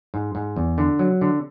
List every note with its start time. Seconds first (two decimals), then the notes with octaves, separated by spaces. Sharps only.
0.14 G#2
0.35 G#2
0.56 E2
0.78 D3
0.99 F#3
1.21 D3